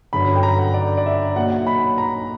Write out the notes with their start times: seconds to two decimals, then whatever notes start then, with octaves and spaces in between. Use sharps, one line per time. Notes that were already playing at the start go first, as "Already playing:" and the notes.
0.13 G1 F#2 D3 F#3 B5
0.36 G5
0.43 A#5
0.59 F#5
0.74 D5
0.97 D5
1.06 E5
1.35 B1 A#2 F#3 F#5
1.67 B5
1.98 A#5